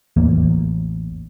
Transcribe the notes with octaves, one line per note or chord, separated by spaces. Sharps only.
A1 E2 A#3